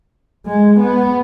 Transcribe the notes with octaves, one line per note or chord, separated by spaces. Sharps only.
G#3
B3